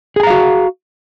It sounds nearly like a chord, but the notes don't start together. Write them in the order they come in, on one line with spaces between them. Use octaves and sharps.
G#4 G#5 A#5 F5 F#4